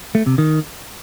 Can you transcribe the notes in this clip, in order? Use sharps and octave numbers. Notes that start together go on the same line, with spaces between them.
A3
C3
D#3